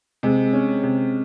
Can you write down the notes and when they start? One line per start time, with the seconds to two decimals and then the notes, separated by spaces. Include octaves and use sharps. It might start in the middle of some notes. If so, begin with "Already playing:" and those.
0.23 C3 G#3
0.53 C#4
0.83 C3